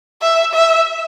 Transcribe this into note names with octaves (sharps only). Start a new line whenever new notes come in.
E5
E5